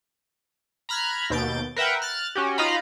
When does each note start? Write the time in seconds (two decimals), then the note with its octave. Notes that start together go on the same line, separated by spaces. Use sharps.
0.89 A#5 B5 F6 F#6 G#6
1.30 D#2 B2 G6 A6 D7
1.76 A#4 B4 E5 F#5 G5
2.02 F6 F#6 A6
2.35 C#4 F#4 G4
2.58 D#4 F4 D#5 F5 A#5 B5